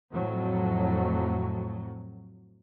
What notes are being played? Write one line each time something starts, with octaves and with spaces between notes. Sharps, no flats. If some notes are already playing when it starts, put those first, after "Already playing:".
F2 A2 F#3